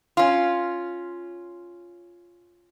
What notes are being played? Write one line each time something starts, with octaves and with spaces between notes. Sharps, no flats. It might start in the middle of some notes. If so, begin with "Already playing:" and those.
C#4 F4